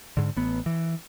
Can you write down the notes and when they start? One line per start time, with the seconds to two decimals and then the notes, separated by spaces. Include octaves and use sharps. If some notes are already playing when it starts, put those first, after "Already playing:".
0.17 G#2 D3
0.37 A1 B3
0.66 E3